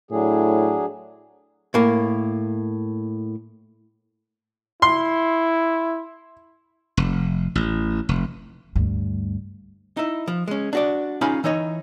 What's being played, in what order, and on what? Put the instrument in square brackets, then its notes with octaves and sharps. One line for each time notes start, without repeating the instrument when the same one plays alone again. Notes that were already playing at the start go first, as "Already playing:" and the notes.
[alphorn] A2 [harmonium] F#3 D4 G#4
[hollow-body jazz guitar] A2 A#3
[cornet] E4 [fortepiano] C6
[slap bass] F1
A1
F1
[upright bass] D2 G2
[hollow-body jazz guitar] D#4 E4
F3
G#3 C#4
D4 F#4 D5
C#4 D#4 F4 G#4 F5 B5
E3 D#4 C#5 D#5